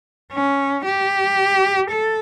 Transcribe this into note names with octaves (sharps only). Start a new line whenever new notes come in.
C#4
G4
A4